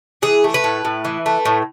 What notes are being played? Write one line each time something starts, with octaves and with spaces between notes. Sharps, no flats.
E3 G#4
A3
B4
A2
A2
E3
A3
A2